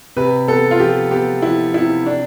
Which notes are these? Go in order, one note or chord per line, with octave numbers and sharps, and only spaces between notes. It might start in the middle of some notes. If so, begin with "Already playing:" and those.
C3 B4
B3 A4
F4
F3 G4
B3 G4
F3 E4
C3 E4
D4